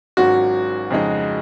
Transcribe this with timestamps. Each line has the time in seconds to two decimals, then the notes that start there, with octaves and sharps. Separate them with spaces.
0.17 G#1 G#2 F#3 C#4 F4 F#4
0.91 F2 C#3 G#3 D#4